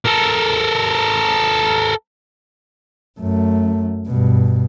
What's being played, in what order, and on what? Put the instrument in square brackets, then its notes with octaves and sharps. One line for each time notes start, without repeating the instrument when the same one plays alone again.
[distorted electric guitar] A4 A#4
[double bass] F#2 A3
G2 B2